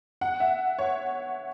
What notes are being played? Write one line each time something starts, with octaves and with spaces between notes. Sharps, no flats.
F#5
E5
C#5